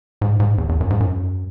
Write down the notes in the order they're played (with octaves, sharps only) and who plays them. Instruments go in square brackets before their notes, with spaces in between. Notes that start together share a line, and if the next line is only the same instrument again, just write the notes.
[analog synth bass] G#2
G#2
E2
E2
F#2
G#2
F#2